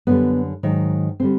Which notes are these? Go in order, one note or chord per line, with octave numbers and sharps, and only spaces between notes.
F#2 D3 G3 B3
G#2 D#3 F#3
D3 G3 C4